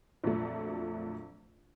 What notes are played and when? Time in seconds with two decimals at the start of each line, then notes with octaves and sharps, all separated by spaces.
0.24 A#1 F2 A#2 F3 F#3 A3